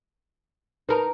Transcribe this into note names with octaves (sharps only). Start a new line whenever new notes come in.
D#4 A#4 B4 A5 A#5